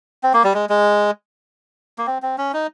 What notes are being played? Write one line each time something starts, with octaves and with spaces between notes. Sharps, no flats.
C4
A#3
G3
G#3
G#3
A#3
C4
C4
C#4
D#4